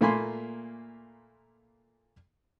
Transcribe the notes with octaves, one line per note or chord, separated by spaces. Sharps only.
A#2 A3 A#3 G#5 B5 C6